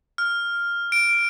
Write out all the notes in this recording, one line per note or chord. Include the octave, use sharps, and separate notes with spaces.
F6
D7